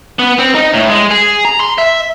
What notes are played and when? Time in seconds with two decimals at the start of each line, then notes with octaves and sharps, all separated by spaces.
0.19 B3
0.39 C4
0.55 D#4
0.74 A2
0.90 G#3
1.11 G#4
1.45 A#5
1.60 C6
1.78 E5